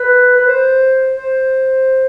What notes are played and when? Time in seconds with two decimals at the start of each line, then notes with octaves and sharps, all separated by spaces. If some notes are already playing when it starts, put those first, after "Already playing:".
Already playing: B4
0.37 B4
0.48 C5
1.13 C5